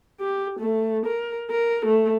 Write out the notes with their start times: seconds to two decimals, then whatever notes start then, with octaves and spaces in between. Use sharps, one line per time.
0.20 G4
0.59 A3
1.06 A#4
1.50 A#4
1.85 A3